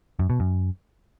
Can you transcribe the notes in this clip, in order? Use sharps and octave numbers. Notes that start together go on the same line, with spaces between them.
F#2
B2
F#2